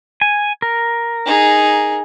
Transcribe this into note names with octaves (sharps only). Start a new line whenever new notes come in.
G#5
A#4
D#4 G#4